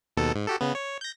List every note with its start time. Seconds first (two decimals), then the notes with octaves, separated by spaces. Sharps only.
0.17 D#2 B2 A4
0.35 G#2
0.47 F#4 G4 A4
0.61 C#3 B3
0.75 C#5
1.01 G6 A#6